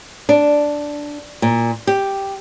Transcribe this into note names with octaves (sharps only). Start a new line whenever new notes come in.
D4
A#2
G4